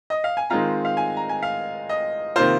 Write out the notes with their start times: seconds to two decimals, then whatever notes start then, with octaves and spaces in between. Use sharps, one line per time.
0.10 D#5
0.24 F5
0.37 G#5
0.50 D#3 G#3 C4 F4 A#5
0.85 F5
0.97 G#5
1.17 A#5
1.29 G#5
1.42 F5
1.89 D#5
2.36 C3 D#3 A#3 F4 C5